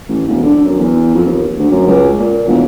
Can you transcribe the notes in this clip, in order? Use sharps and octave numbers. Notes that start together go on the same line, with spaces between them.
A1
E1
D3
F#2
E2
F2
D#2
D2
F#2
C#2
A#2
E1